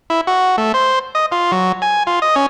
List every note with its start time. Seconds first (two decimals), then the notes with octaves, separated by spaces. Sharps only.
0.10 E4
0.27 F#4
0.58 A3
0.74 C5
1.15 D#5
1.32 F4
1.52 F#3
1.82 G#5
2.07 F4
2.22 D#5
2.36 C#4